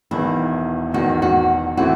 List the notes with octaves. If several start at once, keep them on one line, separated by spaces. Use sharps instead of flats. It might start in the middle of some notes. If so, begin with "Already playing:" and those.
E1 E2 D#3 E4
E1 E2 D#3 F#4
F#4
E3 A3 C4 E4 F#4